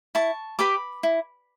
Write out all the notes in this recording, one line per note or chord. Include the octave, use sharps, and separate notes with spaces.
E4 A5 C#6
G4 B4 B5 D6
E4